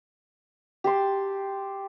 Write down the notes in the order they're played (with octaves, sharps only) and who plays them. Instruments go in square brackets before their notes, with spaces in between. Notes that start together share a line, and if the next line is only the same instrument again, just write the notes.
[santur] G4 A5 C6